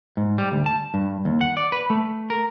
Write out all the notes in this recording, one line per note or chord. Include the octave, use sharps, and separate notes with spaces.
G#2
G3
D2
A5
G2
D#2
F#5
D5
B4
A3
A#4